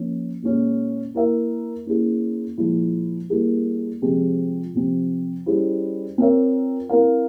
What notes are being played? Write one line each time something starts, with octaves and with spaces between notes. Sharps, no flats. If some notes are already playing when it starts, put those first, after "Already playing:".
Already playing: F3 A#3 C#4
A#2 G#3 C#4
A#3 E4 A#4 E5
A#3 C#4 E4 G#4
A#2 F3 G#3 E4
G3 A#3 E4 G#4
C3 F3 G#3 C4 F4
C3 F3 C4
G3 C#4 E4 G#4 C5
C4 F4 A#4 C#5 E5
C4 E4 A#4 F5